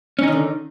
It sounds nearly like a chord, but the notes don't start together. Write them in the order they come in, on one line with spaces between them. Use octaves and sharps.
C#4 D#4 D#3 D3